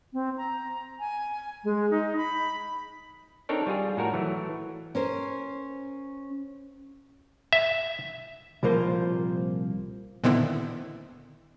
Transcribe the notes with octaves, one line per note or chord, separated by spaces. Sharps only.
C4
A#5
G#5
G#3
D#4
B5
C4 D4 D#4 A4 A#4 C#5
G3 F4 G#4
A2 F#4 A#4 C#5
E3 F#3 A3
C#4 A#4 C5
E5
C2 A#2 F3 A#3 C5
A#2 D3 D#3 B3 C4 E4